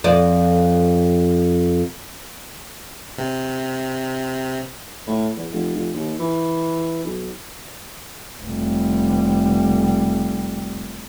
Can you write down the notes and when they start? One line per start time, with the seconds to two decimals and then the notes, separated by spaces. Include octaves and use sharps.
0.04 F2 D5
3.18 C3
5.07 A2
5.37 E2
5.52 F1
5.75 F1
5.95 D#2
6.19 E3
7.05 B1
8.43 F1 G3